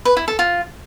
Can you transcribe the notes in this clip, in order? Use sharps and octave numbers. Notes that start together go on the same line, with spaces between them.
B4
E4
A4
F4